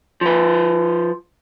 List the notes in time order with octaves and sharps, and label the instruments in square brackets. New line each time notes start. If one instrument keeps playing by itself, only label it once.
[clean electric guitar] F3 B4